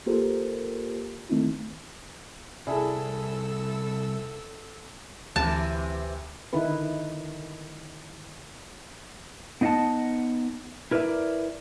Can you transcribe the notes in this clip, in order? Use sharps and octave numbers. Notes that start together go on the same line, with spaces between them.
A#3 F4 G4 A4 A#4 C5
D#3 A3 C4 D#4 E4
C2 E4 G#4 A4 D5 G#5 A5 E6
D2 C3 E3 A5
D3 D#3 D#4 E4 B4
B3 D#4 D#5 F5 F#5 A5
E4 A#4 B4 D5 E5